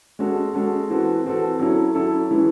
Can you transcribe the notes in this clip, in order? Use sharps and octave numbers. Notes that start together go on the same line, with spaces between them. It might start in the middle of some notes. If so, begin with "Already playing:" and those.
G#3 C#4 F#4 A4
G#3 C#4 F#4 A4
E3 C4 F#4 A4
E3 C4 F#4 A4
F#3 C#4 E4 A4
F#3 C#4 E4 A4
E3 G#3 C#4 E4